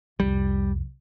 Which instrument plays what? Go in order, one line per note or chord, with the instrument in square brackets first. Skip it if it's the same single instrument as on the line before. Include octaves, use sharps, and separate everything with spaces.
[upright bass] C2 F2 [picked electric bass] G3